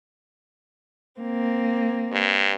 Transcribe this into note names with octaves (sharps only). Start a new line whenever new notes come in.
A#3 C4
G2